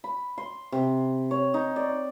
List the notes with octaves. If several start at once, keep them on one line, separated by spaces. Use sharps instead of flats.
B5
C6
C3
C#5
D#4
D5